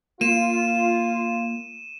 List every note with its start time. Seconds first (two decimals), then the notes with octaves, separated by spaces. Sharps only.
0.21 A#3 F4 D#7 E7